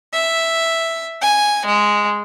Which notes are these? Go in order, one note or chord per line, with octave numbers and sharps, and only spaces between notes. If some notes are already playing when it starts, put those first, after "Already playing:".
E5
G#5
G#3